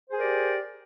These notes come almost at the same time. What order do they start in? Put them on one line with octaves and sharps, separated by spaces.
C5 G#4 A#4 D5 G4